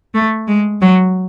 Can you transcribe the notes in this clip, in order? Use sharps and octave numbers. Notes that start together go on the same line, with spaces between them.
A3
G#3
F#3